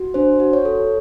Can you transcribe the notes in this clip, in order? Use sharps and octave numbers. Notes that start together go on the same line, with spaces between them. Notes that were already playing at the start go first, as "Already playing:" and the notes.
Already playing: F#4
D4 C5
F#4
C#5
A4